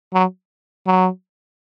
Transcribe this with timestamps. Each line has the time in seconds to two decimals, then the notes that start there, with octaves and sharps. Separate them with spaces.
0.13 F#3
0.87 F#3